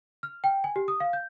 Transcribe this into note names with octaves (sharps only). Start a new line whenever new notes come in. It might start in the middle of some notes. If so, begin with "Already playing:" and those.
F6
G5
G#5
G4
D#6
F5
G6